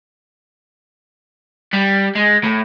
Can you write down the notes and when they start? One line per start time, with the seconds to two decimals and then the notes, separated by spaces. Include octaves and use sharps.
1.73 G3
2.16 G#3
2.44 A2